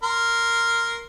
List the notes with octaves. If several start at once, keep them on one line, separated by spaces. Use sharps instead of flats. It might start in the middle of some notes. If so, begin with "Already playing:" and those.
A#4 C6